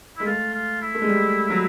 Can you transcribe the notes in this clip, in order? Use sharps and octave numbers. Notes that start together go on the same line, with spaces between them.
G#3 E4
A3 F4
F4
E4
A3
G#3
G3
F#3